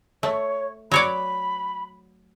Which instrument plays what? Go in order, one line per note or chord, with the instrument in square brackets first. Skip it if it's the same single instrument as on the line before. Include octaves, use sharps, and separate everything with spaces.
[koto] A3 [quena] C#5
[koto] F#3 C#5 D5 [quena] B5